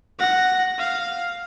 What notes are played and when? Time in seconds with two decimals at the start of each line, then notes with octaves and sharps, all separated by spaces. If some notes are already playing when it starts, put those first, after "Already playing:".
0.19 F#5 A#6
0.78 F5